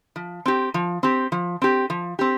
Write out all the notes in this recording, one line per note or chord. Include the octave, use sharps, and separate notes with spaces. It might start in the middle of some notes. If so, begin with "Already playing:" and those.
F3
C4 G4
F3
C4 G4
F3
C4 G4
F3
C4 G4